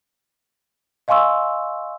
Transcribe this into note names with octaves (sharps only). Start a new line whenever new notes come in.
D#5 F5 G#5 C6 C#6 E6